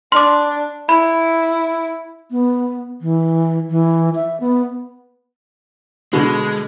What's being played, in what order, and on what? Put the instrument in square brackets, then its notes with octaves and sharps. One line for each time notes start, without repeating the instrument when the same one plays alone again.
[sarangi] D4 [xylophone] C6 D6
[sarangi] E4 [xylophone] B5
[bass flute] B3
E3
E3
E5
B3
[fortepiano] B2 D3 [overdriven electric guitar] G#3